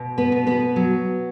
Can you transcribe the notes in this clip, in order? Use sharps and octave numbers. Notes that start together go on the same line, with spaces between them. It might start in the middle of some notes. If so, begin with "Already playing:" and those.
Already playing: B2
B3 B4
B2
B3 B4
F#3